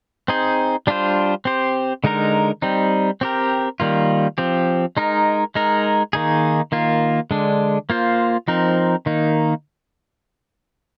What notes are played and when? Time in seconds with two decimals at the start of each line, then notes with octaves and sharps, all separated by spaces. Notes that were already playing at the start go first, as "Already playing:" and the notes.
0.28 C4 D#4 G#4 C5
0.87 G3 D4 F4 C5
1.45 C4 G4 C5
2.04 D3 G#3 D#4 A#4
2.62 G3 C4 D#4
3.21 C4 G4 A#4
3.80 D#3 G3 A#3 F4
4.38 F3 C4 G4
4.97 G#3 D#4 A#4
5.55 G#3 D#4 A#4
6.13 D#3 A#3 D#4 G#4
6.72 D#3 A#3 F4
7.31 D3 G#3 D4
7.90 A#3 F4 C5
8.48 F3 C4 D#4 A#4
9.06 D#3 A#3 D#4